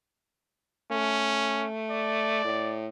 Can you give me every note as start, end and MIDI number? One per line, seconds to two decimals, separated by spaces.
0.91 2.44 57
0.91 1.67 61
1.90 2.79 74
2.44 2.87 45